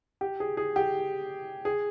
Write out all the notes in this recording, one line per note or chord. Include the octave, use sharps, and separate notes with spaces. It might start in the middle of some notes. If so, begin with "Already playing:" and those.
G4
G#4
G#4
G4
G#4